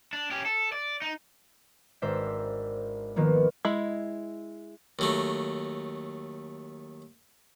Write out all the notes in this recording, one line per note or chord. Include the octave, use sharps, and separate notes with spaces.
D4
C#4 G4
A4
D5
D#4
G#1 D4 A#4 C5 E5 B6
D#3 F3 A#3 B3
G#3 E4 D#5 B5
D#2 F#3 A3